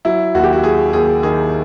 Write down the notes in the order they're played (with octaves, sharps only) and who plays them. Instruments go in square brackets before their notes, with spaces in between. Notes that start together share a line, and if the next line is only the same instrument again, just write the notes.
[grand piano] F#3 E4
D#2 F#4
G4
F#4
F#3 G#4
D#2 G#4
D#3 G#4